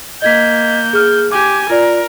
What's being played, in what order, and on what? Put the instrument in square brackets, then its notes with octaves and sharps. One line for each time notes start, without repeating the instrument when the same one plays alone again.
[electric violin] A#3 G6 [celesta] D#5 G#6 B6
[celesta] G#4 F6
[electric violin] G4 G#5 [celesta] D6
[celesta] F4 D5 [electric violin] A#4